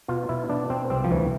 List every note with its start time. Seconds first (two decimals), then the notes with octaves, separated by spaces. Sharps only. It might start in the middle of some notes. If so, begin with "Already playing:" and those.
0.08 B2 F4
0.29 B2 E4
0.49 B2 D4
0.70 B2 C4
0.90 C2 C4
1.04 F3
1.11 D2 E3